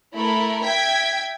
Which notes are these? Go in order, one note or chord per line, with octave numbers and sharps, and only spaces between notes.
A3 E4 A#4 B5
E5 G5 G#6 B6